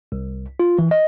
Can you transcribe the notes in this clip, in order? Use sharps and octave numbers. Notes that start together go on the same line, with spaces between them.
C2
F4
E3
D#5